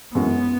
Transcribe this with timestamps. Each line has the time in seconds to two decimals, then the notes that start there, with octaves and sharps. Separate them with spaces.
0.15 F#2 E3 G#3 B3 C#4 F#4